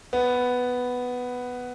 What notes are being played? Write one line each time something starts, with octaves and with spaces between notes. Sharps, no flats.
B3